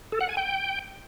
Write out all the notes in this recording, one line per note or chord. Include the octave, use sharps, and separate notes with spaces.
A4
F#5
G#5
G5